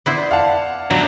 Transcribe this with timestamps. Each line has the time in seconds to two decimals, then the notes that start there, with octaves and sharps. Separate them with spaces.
0.06 B3 E4 C5 D5
0.31 F5 F#5 A5
0.91 G2 B2 F#3